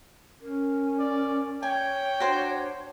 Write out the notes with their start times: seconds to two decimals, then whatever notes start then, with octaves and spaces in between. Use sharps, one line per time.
0.41 C#4 A#4
0.99 D5
1.63 C#5 G5 G#5
2.20 D4 F#4 C5